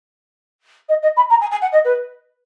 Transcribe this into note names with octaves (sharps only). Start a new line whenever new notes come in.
D#5
D#5
B5
A#5
G#5
G#5
F#5
D#5
B4